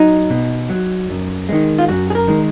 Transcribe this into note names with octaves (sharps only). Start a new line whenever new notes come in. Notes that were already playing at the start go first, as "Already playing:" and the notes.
Already playing: F#3 D#4
B2
F#3
F#2
D#3 G#3
F4
F#2 F#4
G#4
A#4
D#3 G#3